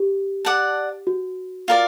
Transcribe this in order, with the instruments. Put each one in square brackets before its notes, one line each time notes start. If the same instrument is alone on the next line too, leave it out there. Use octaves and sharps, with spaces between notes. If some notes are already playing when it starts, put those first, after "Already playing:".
Already playing: [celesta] G4
[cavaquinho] D5 F#5 A5
[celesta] F#4
[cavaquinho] F4 A#4 D5